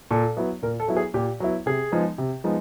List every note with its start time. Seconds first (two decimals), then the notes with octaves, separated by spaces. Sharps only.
0.11 A#2 A4
0.37 F#3 B3 E4
0.62 A#2 A#4
0.80 A4
0.88 F#3 B3 E4
0.97 G#4
1.14 A#2 G4
1.40 F#3 B3 E4
1.66 C3 G#4
1.92 F3 G#3 B3 D#4
2.18 C3
2.44 F3 G#3 B3 D#4